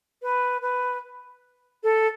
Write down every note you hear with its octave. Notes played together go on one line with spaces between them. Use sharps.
B4
B4
A4